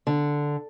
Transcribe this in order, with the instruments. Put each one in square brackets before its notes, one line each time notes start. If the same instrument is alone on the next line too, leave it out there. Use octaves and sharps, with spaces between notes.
[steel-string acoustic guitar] D3